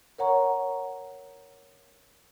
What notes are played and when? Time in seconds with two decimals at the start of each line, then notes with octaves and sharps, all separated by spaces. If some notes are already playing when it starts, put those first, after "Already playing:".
0.18 A#4 C#5 F#5 A#5 C#6